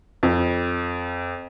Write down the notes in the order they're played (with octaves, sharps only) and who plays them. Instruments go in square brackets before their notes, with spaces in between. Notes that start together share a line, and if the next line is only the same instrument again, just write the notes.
[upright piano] F2